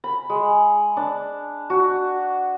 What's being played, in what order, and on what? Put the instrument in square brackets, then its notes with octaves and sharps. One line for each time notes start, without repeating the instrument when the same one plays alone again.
[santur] B5
G#3
D4
F#4